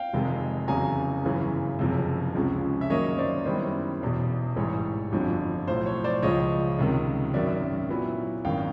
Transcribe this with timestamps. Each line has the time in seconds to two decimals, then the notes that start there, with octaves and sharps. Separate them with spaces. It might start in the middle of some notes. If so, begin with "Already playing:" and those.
Already playing: F5 G5
0.13 F1 F2 C3 D#3 G#3
0.68 F1 E2 C#3 F#3 G#5 A#5
1.24 G1 F#2 C#3 E3
1.79 F#1 F2 C3
2.35 C#2 C3 F3 G#3 C#4
2.81 E5
2.90 F#2 D#3 F#3 A#3 C#5 D#5
3.18 C5 D5
3.45 F#2 D#3 G3 B3 E4 C5
4.01 E1 E2 B2
4.56 A1 G#2 E3 G3 C#5
5.12 G1 F2 D3 F#3
5.67 B1 A2 F3 C5
5.86 C#5
6.04 C5 D5
6.22 C#2 C#3 F3 C#5 D#5
6.79 C#2 C3 D#3
7.34 G#1 F#2 D#3 F#3 D5 E5
7.89 A#2 F#3 B3 E4
8.45 G#1 F#2 D#3 F5 G5